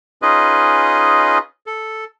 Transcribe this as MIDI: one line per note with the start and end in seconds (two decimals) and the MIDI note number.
0.22 1.38 61
0.22 1.38 63
0.22 1.38 65
0.22 1.38 68
0.22 1.38 71
0.22 1.38 75
1.67 2.04 69